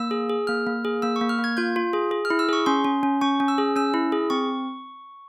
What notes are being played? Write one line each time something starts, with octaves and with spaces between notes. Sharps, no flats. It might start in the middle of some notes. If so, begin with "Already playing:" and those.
Already playing: A#3 E6
G#4
G#4
A#3 F6
A#3
G#4
A#3 E6
C#6
A#3
F6
A#3
G#6
F4 G6
F4
G#4
G#4
F6
E4
E6
G#4 C#6
C#4 C6
C#4
C#4
C#4 C#6
C#4
E6
G#4
C#4 E6
E4
G#4
C4 C#6